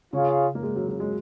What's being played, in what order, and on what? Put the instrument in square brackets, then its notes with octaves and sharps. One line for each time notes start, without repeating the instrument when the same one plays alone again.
[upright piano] C#3 [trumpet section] F4 G#4 C#5 F5
[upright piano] A#3
G#3
F#3
F#3
G#3